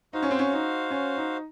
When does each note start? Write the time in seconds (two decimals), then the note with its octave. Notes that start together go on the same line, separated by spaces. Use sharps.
0.13 D#4 F#4 C5 F5
0.22 C#4
0.31 C4
0.39 C#4
0.53 D#4
0.91 C#4
1.17 D#4